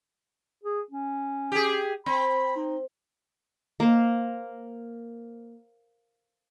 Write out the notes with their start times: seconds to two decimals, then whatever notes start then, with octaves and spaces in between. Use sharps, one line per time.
0.64 G#4
0.91 C#4
1.52 G4 G#4
2.06 C4 B5
2.56 D#4
3.80 A#3 C5